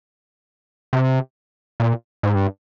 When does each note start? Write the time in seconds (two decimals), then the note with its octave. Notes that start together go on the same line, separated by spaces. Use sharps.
0.93 C3
1.80 A#2
2.23 G#2
2.35 G2